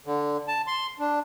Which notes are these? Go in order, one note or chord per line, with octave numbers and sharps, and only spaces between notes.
D3
A5
C6
D4